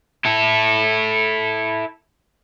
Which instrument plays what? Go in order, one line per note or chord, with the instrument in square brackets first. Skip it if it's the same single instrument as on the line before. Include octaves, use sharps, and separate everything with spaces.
[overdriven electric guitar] E4 A4